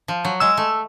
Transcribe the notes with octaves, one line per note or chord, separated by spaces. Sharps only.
F3
F#3
G#3 E6
A3